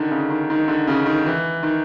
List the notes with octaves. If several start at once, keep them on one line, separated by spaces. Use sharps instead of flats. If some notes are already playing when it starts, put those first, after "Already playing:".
Already playing: D3 D#3
C#3
D#3
D#3
D3
C#3
D#3
E3
D#3